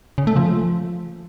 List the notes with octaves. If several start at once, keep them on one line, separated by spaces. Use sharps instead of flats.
C#3
A3
F3